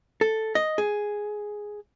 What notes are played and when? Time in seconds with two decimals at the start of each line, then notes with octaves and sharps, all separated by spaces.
0.21 A4
0.55 D#5
0.78 G#4